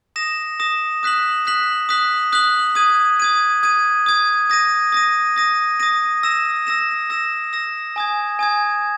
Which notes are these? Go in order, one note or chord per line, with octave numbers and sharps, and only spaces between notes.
D#6 A#6 E7
D#6 A#6 E7
D#6 F#6 B6 F#7
D#6 F#6 B6 F#7
D#6 F#6 B6 F#7
D#6 F#6 B6 F#7
D#6 G#6 D#7
D#6 G#6 D#7
D#6 G#6 D#7
D#6 G#6 D#7
D#6 A#6 D#7
D#6 A#6 D#7
D#6 A#6 D#7
D#6 A#6 D#7
E6 A#6 E7
E6 A#6 E7
E6 A#6 E7
E6 A#6 E7
G#5 D#6 G#6
G#5 D#6 G#6